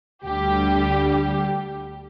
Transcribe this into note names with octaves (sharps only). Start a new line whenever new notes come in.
D2 D3 G3 G4